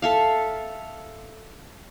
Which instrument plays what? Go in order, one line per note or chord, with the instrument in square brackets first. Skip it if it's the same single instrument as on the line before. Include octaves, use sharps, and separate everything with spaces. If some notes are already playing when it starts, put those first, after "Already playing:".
[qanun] A4 E5 F5